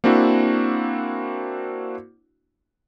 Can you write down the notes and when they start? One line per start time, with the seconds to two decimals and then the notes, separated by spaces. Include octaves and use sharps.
0.04 A#3 C4 D4 E4 F#4